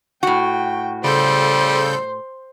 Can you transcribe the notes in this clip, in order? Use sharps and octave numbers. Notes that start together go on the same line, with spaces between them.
A2 F#4 G5
C#3 G3 A4 C5 G6